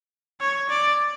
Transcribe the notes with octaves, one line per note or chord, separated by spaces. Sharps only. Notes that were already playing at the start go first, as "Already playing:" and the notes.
C#5
D5